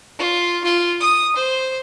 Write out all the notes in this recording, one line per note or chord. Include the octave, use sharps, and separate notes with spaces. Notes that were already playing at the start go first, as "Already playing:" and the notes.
F4
F4
D#6
C5